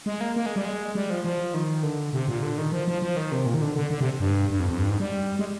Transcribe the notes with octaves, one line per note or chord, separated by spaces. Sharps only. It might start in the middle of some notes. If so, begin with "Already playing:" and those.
G#3
A#3
A#3
G#3
G3
G#3
G3
F3
F3
D#3
D3
C3
A#2
D3
D#3
F3
F3
F3
D#3
C3
A#2
D#3
D3
D3
D3
C3
G2
G2
F2
F2
G2
G#2
G3
G#3